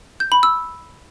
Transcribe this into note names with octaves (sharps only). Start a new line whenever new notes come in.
G6
B5
E6